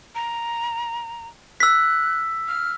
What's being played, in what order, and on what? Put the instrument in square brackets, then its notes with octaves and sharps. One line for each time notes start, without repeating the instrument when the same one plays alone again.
[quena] A#5
[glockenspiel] E6 B6 [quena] F#6
[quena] F6